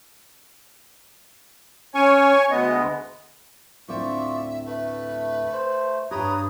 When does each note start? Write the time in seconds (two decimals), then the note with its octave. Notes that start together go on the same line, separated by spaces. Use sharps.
1.95 C#4 C#5 G#5 C#6
2.51 D2 G#3 B3 D#5
3.88 D2 A2 C4 F4 D5 E5 C#6
4.66 A3 B4
5.53 C5
6.11 G2 G4 B4 C#5 A#5 D#6